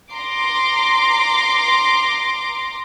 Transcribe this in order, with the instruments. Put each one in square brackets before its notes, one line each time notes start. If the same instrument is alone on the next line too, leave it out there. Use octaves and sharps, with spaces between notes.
[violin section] A#5 C6 D6